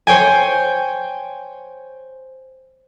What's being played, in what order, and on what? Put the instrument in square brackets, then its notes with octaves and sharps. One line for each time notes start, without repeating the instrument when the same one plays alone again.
[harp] C5 C#5 G5 G#5